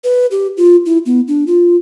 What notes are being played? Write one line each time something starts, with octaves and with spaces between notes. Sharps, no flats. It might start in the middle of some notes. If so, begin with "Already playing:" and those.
B4
G4
F4
E4
B3
D4
F4